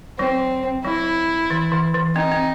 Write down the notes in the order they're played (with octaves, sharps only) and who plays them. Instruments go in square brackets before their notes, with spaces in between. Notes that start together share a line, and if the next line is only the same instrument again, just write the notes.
[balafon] F#3 [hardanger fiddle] C4
[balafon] F#3 [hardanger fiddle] E4
[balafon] E3
E3
E3
[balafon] C4 [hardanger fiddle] D#4
[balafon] C4